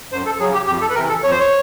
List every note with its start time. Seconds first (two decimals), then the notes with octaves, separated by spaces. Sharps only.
0.12 F#2 C5
0.26 A4
0.40 F#3 G#4
0.43 C#3
0.53 G4
0.67 F2 G4
0.81 A4
0.90 B4
0.95 C3 E3 A#4
1.09 A4
1.23 F2 C#5
1.31 C5
1.39 C#5